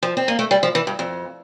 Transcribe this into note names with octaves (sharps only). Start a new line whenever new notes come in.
F3
C4
A#3
A3
G3
F3
E3
G2
F2